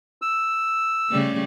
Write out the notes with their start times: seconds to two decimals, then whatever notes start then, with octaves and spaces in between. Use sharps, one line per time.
0.22 E6
1.09 C#3 G3 A3